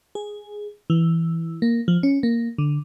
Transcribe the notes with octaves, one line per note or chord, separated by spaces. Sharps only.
G#4
E3
A#3
F3
C#4
A#3
D3